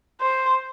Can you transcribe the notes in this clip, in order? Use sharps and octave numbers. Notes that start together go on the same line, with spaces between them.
C5